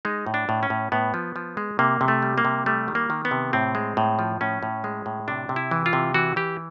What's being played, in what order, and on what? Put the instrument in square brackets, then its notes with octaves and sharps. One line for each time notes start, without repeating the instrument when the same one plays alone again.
[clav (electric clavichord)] G#3 D#4
A2
D4
A2
C#4
A2
A2 B3
F3
F3
G#3
C3 A#3
C3
A3
G3
A#3
C3
G3 A3
D#3
A#3
D#3
B3
C3
A2 C4
G#3
A2
F3
A2 C#4
A2
G#3
A2
C3 D4
C3
E4
E3
F4
C3
E3 F#4
E3 G4